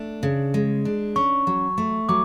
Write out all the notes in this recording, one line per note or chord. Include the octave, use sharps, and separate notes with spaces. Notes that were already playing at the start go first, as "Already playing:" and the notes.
Already playing: A3 D4
C#3
G#3
D4
C#4 C#6
F#3
A3
F#3 D6